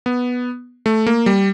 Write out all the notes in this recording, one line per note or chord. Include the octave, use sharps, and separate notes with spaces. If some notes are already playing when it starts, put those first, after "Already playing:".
B3
A3
A#3
G3